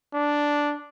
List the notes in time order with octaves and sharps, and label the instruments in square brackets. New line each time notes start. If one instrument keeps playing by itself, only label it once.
[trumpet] D4